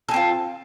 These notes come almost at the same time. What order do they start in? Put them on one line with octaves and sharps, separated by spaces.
A4 G#4 C4 F4